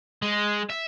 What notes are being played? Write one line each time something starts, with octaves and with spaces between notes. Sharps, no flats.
G#3
E5